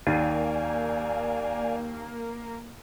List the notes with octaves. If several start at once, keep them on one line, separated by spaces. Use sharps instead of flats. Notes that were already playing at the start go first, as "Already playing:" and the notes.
D#2 A#3 D5 F5 G#5